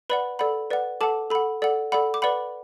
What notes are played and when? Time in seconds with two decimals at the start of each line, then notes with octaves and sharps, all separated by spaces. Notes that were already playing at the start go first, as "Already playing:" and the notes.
0.10 B4 D5 F#5 B5
0.39 A4 D5 F#5 B5
0.70 B4 D5 F#5
1.01 A4 F#5 A5 D6
1.30 A4 F#5 B5
1.62 A4 D5 F#5
1.92 A4 D5 F#5 B5
2.14 D6
2.22 B4 D5 F#5 B5